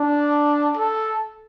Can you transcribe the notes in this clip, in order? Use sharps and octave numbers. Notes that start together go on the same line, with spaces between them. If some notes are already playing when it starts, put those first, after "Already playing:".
Already playing: D4
A4